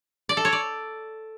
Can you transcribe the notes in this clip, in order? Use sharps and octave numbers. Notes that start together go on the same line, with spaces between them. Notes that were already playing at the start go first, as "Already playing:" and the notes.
D5
A4
C#5
D5